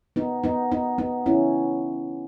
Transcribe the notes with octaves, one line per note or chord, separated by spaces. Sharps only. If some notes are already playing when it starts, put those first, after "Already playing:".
B3 D#4
B3 D#4
B3 D#4
B3 D#4
C#4 E4